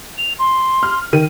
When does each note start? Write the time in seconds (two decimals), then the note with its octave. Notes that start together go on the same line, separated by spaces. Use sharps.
0.18 F7
0.39 C6
0.83 F6
1.13 D#3 D#7